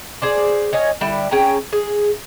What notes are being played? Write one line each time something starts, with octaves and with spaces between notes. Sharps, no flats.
G#4 C5 D5
C#5 D#5 F5 G#5
D3 G3 E4
C#4 G#4 G5 A#5
G#4